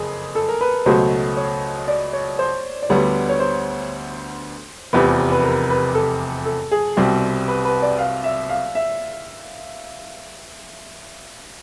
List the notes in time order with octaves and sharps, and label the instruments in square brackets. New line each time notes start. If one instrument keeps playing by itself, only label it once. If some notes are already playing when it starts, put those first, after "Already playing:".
Already playing: [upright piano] F#1 F2 [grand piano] G#4
[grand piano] A4
A#4
B4
[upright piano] C#2 B2 F#3 A3 [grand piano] C5
[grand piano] C#5
D5
C#5
C5
D5
[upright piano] D2 D3 G3 B3 [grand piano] C#5
[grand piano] C#5
C5
[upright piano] F1 E2 C3 F3 [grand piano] B4
[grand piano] B4
A#4
B4
A4
A4
G#4
[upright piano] C2 B2 G3 C4 [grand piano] G4
[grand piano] B4
B4
D5
F5
E5
F5
E5